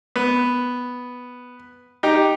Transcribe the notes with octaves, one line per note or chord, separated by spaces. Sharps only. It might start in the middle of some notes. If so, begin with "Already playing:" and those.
B3
D#4 G4 G5